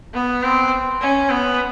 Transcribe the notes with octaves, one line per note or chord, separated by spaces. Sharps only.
B3
C4
C#4
B3